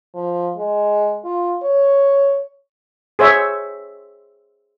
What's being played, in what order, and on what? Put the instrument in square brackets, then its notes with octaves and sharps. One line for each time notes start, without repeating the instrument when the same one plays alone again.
[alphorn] F3
G#3
F4
C#5
[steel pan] G#4 C5 C#5 E5